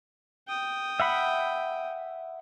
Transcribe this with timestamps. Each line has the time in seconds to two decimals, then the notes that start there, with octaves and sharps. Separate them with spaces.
0.48 G5 D#6
1.00 E5 F#5 B5